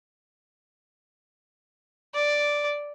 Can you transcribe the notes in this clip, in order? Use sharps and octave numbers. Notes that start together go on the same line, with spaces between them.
D5